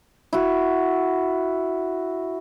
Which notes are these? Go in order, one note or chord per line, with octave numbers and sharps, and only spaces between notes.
E4 F#4